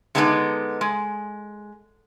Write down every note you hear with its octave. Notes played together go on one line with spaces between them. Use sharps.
D3 G#3 B3 D#4 G#4 D5
G#3